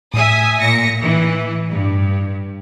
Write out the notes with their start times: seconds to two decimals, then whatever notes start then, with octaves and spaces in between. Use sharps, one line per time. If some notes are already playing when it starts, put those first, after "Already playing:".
0.14 A2 E5 G#5 D#6
0.59 A#2 A#6 C#7
1.01 E3
1.71 G2